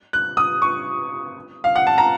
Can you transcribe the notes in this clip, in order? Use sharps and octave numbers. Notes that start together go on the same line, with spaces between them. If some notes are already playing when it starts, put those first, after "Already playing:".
F#6
D#6
C#6
F5
F#5
A5
A#5